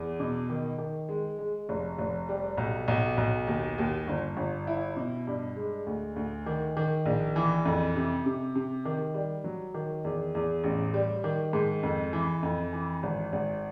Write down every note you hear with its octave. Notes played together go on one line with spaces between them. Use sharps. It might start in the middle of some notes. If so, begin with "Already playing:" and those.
Already playing: E2
B2
D#3
D#3
G#3
G#3
F1
F1
G3
B1
B1
B1
D#2
D#2
G1
G1
E4
B2
G2
G#3
D2
D2
D#3
D#3
A#1
E3
F2
C3
C3
C3
D#3
G3
F#3
D#3
E2
E2
A1
G3
D#3
G#2
F2
E3
F2
E3
G#1
G#1